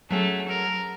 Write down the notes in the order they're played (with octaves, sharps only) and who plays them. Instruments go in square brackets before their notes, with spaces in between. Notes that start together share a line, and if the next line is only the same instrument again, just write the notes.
[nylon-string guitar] F#3 C#4 G#4 [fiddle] A3
[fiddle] A#4